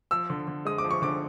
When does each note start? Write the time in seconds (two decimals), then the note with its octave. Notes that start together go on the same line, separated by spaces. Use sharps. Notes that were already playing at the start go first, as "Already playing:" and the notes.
0.11 F3 E6
0.30 D3
0.47 D3
0.65 G#3 D#6
0.78 D6
0.84 F3
0.91 C#6
1.02 D3 D6